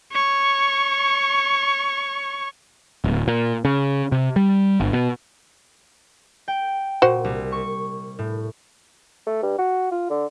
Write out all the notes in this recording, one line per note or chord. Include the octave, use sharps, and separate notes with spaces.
C#5 C#6
D1
A#2
C#3
C3
G3
G1
B2
G5
A#2 F#4 C5 F#5
C2
C#6
A2
A3
G2
F#4
F4
D3